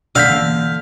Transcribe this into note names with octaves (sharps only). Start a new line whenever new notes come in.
B2 D3 D#3 A3 F5 E6 G6 B6
E3 A#3